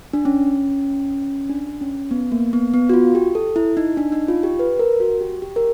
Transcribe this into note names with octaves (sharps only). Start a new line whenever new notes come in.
D4
C#4
D4
C#4
B3
A#3
B3
B3
F#4
F4
G4
A4
E4
D#4
D4
D#4
F4
G4
B4
A#4
F#4
G4
G4
A#4